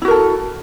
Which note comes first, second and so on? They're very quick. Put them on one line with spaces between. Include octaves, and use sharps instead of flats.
E4 F#4 A#4 A4